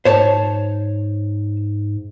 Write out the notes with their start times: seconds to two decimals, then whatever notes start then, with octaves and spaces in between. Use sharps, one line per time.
0.05 G#2 C5 C#5 A5